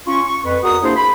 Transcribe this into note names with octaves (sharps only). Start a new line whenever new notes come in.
C#4 F4 C6 C#6
C#6
F2 B4
E2 F#4 A#4 F#5 D#6
A#3 D4 E4 G#4 C5
B5